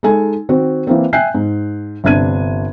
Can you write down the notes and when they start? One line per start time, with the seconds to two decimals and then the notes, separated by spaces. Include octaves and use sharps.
0.03 G#3 D#4 A4 G#5
0.49 D#3 C4 F#4
0.87 E3 A#3 C4
1.13 E5 G5 G#5 F#6 G6 C7
1.35 G#2
2.04 G1 C3 D4 G#6 D#7